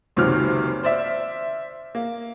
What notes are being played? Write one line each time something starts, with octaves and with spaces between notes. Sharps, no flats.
F#1 C#2 C3 D#3 F#3 F6
C5 D5 E5
A#3